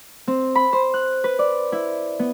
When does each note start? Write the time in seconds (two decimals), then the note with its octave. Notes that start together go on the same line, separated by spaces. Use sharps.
0.28 C4
0.55 B5
0.73 C5
0.94 F#6
1.24 B4
1.39 D5
1.72 E4
2.19 B3